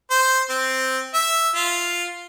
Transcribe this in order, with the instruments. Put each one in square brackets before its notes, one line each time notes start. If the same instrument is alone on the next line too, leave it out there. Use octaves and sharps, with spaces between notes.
[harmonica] C5
C4
E5
F4